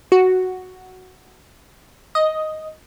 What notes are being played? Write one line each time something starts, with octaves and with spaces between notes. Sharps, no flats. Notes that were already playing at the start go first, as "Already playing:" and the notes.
F#4
D#5